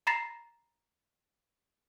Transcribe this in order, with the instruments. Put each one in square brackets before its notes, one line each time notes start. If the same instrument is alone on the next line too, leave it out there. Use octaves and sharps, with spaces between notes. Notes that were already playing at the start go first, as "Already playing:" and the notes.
[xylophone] A#5 B5 A6 A#6 C7 E7